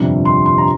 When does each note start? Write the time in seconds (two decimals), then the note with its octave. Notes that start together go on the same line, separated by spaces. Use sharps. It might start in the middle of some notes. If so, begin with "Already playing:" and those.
Already playing: G1 F2 C3 G3
0.25 C6
0.46 C6
0.58 A#5